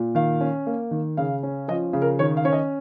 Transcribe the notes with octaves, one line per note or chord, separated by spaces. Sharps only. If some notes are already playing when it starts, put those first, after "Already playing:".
Already playing: A#2
D#3 F5
C#4
A#3
D#3
C#3 F5
C#4
F3 D#5
C#3
A#4
D#3 C#5
F5
C#4 C#5
D#5